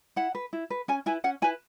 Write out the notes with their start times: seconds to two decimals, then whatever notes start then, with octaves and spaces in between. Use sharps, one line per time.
0.16 E4 F#5
0.35 B4
0.53 E4
0.70 B4
0.88 C#4 G#5
1.06 E4 B4 G#5
1.24 C#4 F#5
1.42 E4 B4 G#5